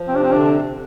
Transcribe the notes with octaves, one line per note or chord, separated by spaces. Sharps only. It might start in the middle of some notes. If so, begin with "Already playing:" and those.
Already playing: F3
C3 C4
D4
C4
D3 D4